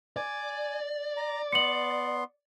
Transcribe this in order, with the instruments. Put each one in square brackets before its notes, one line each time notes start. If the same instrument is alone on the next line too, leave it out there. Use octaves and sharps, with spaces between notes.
[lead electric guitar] D5 [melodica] G#5
[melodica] A#5
[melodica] B3 C6 [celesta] C#7 F#7